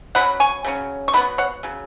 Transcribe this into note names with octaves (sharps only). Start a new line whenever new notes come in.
C#3 F#3 C#4 F#5 B5
G#5 C#6
C#3 F#3 C#4
C#6
C#3 F#3 B3 F#5 B5
C#5 F#5
C#3 F#3